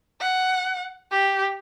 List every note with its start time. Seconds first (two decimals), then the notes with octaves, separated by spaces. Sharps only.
0.20 F#5
1.11 G4